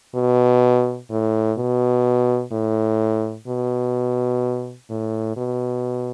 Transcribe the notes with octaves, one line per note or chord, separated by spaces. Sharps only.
B2
A2
B2
A2
B2
A2
B2